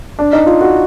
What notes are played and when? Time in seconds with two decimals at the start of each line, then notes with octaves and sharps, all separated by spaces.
0.19 D4
0.33 D#4
0.46 F4
0.61 F#4